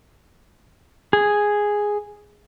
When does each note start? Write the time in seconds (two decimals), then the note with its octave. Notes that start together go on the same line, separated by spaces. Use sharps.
1.13 G#4